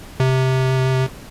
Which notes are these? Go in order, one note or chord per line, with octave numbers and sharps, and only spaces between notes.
C3